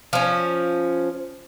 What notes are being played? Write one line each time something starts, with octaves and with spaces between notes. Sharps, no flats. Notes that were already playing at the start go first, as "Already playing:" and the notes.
F3 C#4